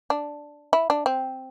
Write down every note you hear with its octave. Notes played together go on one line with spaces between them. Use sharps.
D4
E4
D4
C4